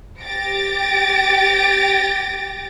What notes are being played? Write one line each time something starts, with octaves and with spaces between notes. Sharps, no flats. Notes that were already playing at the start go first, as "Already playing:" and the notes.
G4 A6 A#6 D7